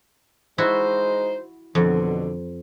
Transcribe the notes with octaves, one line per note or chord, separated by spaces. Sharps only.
G#3 D#4 E4 F#4 C5
F2 B2 D3